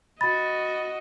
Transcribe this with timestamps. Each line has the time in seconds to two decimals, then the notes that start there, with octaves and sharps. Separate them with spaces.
0.21 F#4 D#5 B5 A6